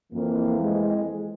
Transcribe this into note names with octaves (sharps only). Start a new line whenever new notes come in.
F2 E3 A#3
G#3